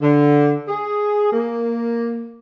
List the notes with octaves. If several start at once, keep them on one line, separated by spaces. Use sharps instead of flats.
D3
G#4
A#3